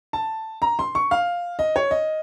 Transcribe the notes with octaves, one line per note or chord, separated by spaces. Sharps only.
A5
A#5
C6
C#6
F5
D#5
C#5
D#5